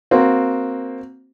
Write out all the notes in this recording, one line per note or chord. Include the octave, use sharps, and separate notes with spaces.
A#3 C4 F#4